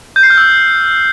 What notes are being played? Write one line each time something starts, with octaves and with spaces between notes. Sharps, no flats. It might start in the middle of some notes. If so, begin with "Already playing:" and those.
G6
C7
F6
E6